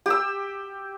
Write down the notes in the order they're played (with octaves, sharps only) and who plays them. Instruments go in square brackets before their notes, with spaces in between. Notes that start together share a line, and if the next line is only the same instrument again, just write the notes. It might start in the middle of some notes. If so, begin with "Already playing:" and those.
[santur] G4 E6